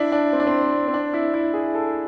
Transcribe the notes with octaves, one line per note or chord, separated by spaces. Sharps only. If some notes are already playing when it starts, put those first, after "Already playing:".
Already playing: D4 E4
D4
C4
D4
C4
C4
D4
E4
E4
G#4
A4